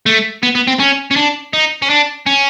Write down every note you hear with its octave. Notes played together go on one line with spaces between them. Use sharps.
A3
B3
B3
C4
C#4
C#4
D4
D#4
C#4
D4
C#4